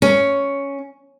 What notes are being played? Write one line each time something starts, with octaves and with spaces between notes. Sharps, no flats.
C#4